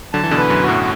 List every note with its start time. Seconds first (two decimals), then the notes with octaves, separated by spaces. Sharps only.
0.13 D3 F#3 A5
0.24 E3
0.31 B2 D3
0.37 B4
0.50 F#2
0.62 F#4
0.68 F#2 A2